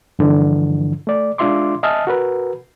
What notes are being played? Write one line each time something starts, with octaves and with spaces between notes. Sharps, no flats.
G2 D3 E3 F3
A3 D5
G#3 D4 F4 E5 C6 D6
D#5 E5 G#5 A5 D#6 F6
F#4 A#4 B4